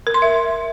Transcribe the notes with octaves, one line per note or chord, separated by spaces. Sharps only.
A#4
C6
E5